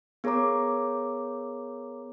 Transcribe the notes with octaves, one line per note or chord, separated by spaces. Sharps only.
B3 G#4 A#4 C#5 A#5 D6